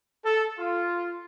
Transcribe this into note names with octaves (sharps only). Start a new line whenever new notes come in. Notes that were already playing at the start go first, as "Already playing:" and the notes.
A4
F4